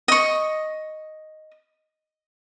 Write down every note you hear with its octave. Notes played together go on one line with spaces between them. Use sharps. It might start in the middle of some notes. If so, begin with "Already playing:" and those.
D#5 C#6